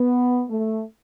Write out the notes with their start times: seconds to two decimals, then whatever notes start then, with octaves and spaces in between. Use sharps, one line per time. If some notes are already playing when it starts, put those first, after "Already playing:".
Already playing: B3
0.50 A3